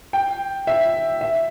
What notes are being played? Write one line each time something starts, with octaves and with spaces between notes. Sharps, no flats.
G5
E5
E5